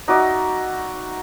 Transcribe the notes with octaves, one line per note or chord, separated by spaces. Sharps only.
D#4 F#4 D5 E5